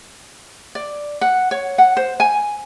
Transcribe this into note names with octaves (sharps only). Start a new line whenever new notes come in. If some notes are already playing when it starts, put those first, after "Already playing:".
D5
F#5
C#5
F#5
C5
G#5